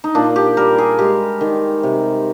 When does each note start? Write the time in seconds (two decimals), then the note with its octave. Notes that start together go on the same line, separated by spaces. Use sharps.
0.04 D#4
0.15 A#2 D4
0.36 G4
0.57 G3 A#4
0.78 G#4
0.99 G#3 G4
1.41 D#3
1.83 C3